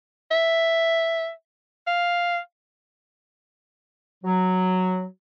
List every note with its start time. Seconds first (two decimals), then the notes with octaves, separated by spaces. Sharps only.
0.31 E5
1.87 F5
4.24 F#3